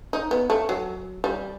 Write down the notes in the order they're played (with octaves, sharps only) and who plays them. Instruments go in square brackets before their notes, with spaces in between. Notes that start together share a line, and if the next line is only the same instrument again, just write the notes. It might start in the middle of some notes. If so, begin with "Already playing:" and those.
[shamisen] D#4
B3
A3
F#3
G3